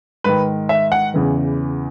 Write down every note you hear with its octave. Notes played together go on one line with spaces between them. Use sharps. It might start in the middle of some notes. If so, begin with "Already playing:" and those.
G#2 D#3 B4
E5
F#5
E2 C#3 E3